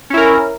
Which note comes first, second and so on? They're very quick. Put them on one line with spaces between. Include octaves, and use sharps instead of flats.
C#4 E4 A#4